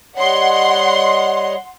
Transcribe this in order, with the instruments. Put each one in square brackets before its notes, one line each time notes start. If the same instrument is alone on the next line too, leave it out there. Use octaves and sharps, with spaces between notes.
[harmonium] G3 C#5 D#5 [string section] F#5 C6